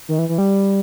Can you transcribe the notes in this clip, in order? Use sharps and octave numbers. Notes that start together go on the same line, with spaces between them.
D#3
E3
E3
G3